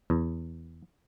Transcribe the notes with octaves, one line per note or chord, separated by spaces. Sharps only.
E2